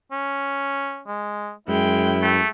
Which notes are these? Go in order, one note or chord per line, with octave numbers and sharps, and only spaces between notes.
C#4
G#3
F#2 G#3 E4 G5
A3